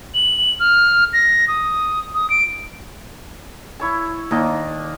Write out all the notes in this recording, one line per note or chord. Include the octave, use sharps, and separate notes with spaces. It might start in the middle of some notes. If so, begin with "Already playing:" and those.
F#7
F6
A#6
D#6
D#6
D7
E4 C#5 A5
D#2 A#3 D4 D#5